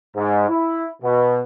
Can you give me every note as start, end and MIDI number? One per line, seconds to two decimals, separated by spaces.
0.15 0.47 44
0.49 0.87 64
1.02 1.41 47